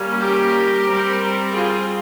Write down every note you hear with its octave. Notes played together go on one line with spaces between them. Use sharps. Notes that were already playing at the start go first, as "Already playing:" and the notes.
Already playing: G3 A#3 C#4
G4 A#4
G3 C4
F4 G#4